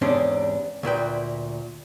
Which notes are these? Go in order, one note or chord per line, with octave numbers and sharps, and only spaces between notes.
E2 G#2 C3 C#4 D4
D2 A#2 B4 G5